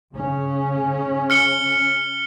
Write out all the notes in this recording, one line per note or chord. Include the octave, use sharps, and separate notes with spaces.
C#3 C#4
F6 C#7 G7